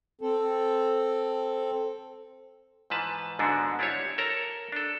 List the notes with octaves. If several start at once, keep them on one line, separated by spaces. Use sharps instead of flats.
C4 A4
G#2 E3 F3 B4 A5
G#2 D3 B3 D4 F#4
D4 E4 F4 G4 C5 C#5
A4 A#4 C#5 A#5
D4 A4